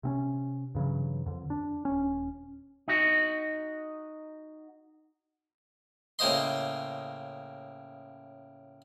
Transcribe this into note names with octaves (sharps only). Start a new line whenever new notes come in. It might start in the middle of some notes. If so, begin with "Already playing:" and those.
C3 C4 C#4
G2 C#3 E3 F#3
F2 D3
D4
D#1 C#4
D#4 F#4
A2 C#3 A#3 C5 D#5 C6